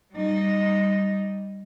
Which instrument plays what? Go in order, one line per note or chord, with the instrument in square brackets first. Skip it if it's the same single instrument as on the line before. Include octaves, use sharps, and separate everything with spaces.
[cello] G3 D#4